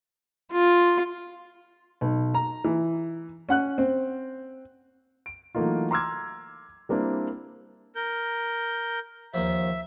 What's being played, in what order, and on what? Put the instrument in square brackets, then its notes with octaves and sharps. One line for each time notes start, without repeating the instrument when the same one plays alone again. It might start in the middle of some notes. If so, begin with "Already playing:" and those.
[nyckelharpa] F4
[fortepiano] B1
A#5
E3
C#4 F#5 F#6
C4
[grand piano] D7
E3 F#3 A3 A#3 D#4 F4
A#5 C6 D6 E6 F6 G#6
G3 A#3 C4 D4 E4
[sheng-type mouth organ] A#4 G6
[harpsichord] D#2 D#3 F3 [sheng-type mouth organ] E5